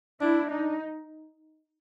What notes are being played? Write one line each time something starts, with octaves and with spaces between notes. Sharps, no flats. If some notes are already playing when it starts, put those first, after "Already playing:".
D4 E4
D4 D#4